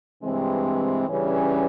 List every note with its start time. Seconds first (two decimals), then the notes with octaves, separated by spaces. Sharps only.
0.22 G2 C3 E3 G#3 C4
1.09 G2 C#3 E3 G3 C#4